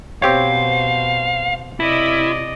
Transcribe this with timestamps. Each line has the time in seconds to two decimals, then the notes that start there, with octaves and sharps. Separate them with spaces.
0.22 B2 C4 G4 C5 C#5 F5
1.80 C3 E4 D5 D#5